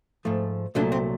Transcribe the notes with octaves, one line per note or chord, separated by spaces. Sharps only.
G#2 F3 A3
C2 A#2 F#3 A3 D4
C4